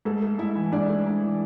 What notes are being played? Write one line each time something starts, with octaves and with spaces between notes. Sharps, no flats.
G#2 A3 A4
A3
G#2 E4 E5
E3
G#2 D4 D5
A3
G#2
E3